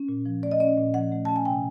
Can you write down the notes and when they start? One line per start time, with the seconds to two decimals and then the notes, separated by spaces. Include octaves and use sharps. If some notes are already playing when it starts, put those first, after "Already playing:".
Already playing: C#4
0.09 A#2
0.26 F3
0.43 A3 D5
0.51 D#5
0.60 C#4 D5
0.77 A#2
0.94 F3 F#5
1.12 A3
1.25 C#4 A5
1.36 G#5
1.45 C3 G5